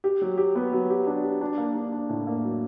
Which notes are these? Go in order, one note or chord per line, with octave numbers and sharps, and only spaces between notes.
G4
F#3
G4
B3
F#3
G4
D4
G4
D4
A#3
D4
D4
A2
A#3
F#3